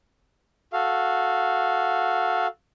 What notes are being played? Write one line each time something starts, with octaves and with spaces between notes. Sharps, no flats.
F#4 A4 F5